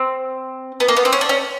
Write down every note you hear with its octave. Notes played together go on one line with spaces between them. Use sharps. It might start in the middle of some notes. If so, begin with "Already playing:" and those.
Already playing: C4
B3
A#3
B3
C4
C#4
D4
C#4